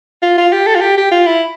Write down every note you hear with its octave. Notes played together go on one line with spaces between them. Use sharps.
F4
F4
G4
A4
F4
G4
G4
F4
E4